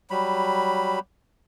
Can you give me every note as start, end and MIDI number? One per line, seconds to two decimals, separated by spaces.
0.10 0.99 54
0.10 0.99 55
0.10 0.99 83